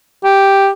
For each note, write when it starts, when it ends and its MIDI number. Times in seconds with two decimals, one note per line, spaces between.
0.24 0.69 67